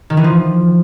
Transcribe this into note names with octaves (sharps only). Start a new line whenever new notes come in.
D#3
E3
F3